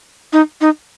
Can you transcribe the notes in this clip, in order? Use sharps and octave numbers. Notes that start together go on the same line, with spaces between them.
D#4
D#4